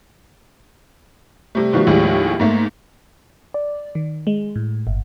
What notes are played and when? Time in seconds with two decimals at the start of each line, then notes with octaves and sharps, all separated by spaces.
1.55 C3 G3 A3
1.73 B2 D#3 F3 G3 A3
1.87 D#2 A2 F3 G3 G#3
2.40 G#2 A3 A#3
3.54 D5
3.95 D#3
4.27 G#3
4.56 A2
4.87 G1